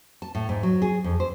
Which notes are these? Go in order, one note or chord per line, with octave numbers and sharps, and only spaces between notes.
A5
A2
G#2
F#3
G#4
F2
C5